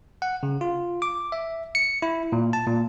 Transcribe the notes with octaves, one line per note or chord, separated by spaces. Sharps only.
F#5
C#3
F4
D6
E5
C#7
E4
A#2
A5
A#2